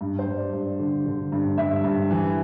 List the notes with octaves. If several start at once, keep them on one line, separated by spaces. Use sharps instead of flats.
G2
C5
G2
D5
G2
D3
D3
G2
G2 E5
G2
E3